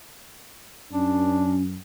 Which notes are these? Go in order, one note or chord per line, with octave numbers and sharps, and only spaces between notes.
F#2 C#4 D4